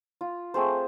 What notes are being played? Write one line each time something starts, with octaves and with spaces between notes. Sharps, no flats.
F4
A3 C4 G#4 C5